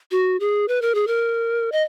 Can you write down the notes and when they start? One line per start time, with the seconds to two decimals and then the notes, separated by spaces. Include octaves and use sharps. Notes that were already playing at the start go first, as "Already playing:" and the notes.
0.11 F#4
0.40 G#4
0.68 B4
0.82 A#4
0.95 G#4
1.07 A#4
1.72 D#5